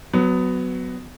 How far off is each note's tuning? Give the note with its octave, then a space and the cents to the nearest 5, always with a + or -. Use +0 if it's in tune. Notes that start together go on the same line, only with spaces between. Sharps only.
F#3 +0 B3 +20